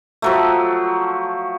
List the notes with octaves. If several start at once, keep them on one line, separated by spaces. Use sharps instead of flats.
F3 F#3 A3